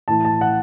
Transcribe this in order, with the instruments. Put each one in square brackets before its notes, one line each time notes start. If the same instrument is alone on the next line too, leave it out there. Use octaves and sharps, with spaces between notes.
[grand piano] A2 E3 A5
A5
F#5